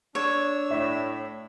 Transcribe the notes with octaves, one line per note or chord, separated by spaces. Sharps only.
D4 C#5 E6
A2 E5